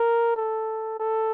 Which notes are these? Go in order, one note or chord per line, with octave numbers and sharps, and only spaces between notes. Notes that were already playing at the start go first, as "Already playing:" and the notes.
Already playing: A#4
A4
A4